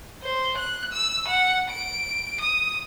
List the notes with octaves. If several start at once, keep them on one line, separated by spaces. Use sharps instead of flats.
C5
F#6
E6
F#5
D7
D#6